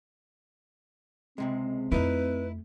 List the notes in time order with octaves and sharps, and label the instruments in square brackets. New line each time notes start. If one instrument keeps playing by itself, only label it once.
[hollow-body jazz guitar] C#2 C3 G#3 [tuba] C4
[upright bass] F2 A3 [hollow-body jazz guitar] D#4 E4 [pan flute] B4